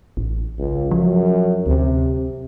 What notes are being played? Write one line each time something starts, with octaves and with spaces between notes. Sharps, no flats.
A1
C#2
F#2 F3
D2 C3